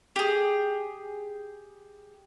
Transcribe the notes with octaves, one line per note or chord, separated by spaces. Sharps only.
G4 G#4